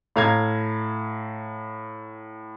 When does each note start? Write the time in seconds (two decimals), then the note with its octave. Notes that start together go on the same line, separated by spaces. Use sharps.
0.16 A2 F5 A#5 G#6